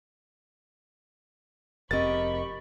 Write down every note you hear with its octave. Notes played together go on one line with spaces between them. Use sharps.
F1 C4 G4 A#4 D#5 B5 C#6 A6